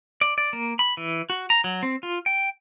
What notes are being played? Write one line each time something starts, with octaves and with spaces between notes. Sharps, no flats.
D5
D5
A#3
B5
E3
F#4
A#5
F#3
C4
F4
G5